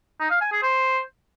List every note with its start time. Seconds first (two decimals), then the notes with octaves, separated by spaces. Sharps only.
0.20 D#4
0.31 F5
0.41 G#5
0.52 G#4
0.62 C5